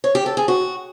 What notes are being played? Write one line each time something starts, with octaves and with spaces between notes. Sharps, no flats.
C#5
G4
A4
G#4
F#4